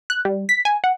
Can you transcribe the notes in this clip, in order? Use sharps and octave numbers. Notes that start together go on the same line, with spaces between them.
F#6
G3
B6
G#5
F#5